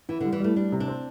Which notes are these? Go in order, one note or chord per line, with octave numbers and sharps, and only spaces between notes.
E3 E4
D3
G3
E3
G3 A3
G3 D4
C3
D4
C4